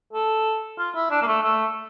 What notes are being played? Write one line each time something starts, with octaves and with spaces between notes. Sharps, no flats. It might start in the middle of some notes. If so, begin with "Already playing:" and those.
A4
F4
E4
D4
A#3
A3
A3